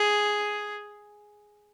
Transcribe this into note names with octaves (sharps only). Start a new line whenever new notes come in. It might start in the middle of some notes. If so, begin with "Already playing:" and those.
Already playing: G#4